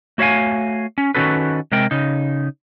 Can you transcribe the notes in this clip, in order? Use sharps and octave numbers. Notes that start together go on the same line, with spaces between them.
A3 F#4 C#5 E5 F5 G#5
C#4
D#3 F#3 C#4 F#4 A4 B4
C3 G#3 A#4 G5
C#3 D#4